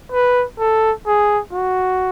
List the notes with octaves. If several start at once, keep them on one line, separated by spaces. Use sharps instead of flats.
B4
A4
G#4
F#4